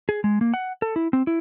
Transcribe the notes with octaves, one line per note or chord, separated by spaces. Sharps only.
G#4
G#3
A#3
F#5
A4
E4
C4
E4